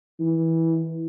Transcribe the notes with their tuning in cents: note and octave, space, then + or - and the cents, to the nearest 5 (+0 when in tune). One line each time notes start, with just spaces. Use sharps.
E3 -15